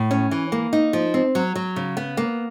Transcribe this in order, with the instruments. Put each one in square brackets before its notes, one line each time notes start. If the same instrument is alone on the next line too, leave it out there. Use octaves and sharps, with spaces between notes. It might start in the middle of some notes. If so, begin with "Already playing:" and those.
Already playing: [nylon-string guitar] A2
C#4
E3
A#3
D#4
F3
C4
F#3
F#3
C#3
B3
A#3